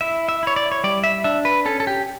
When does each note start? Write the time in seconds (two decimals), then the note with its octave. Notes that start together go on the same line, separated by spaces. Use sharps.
0.01 E4 E5
0.29 E5
0.43 E4 C#5
0.56 D5
0.72 C#5
0.84 G3 D5
1.04 E5
1.24 D4 E5
1.45 B4
1.65 C#4 A4
1.80 A4
1.87 G4